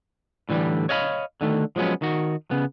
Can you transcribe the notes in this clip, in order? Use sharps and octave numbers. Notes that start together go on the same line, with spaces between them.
A2 D3 E3 G3
C#5 D#5 F5 F#5 B5
D3 D#3 A3
F3 F#3 G#3 B3 C#4
D#3 F#4
C#3 B3